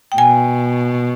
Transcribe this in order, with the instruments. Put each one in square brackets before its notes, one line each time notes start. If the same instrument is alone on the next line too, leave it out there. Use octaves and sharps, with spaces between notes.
[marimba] G5
[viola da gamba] B2 [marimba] G#5